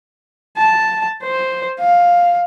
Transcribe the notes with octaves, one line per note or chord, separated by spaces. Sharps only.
A5
C5
F5